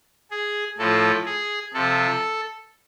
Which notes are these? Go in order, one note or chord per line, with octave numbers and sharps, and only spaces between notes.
G#4
A2 F3 A4
G#4
C3 F3 A4